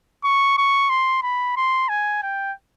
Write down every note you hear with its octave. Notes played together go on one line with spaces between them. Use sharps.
C#6
C#6
C6
B5
C6
G#5
G5